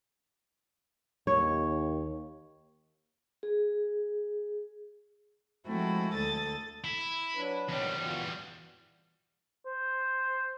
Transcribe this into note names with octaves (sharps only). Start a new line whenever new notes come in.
D#2 C#5
G#4
F3 G#3 A3 C4 E4 F#4
D2 A4 D#6 A6
E4
F#3 D4 B4
E2 D#3 F#3 G3 C4
B3 F4 F#4
C5